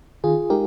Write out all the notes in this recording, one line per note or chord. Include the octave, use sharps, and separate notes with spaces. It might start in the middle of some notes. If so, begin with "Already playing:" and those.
D#3 F4 G#4
G#3 D#4 G4 A#4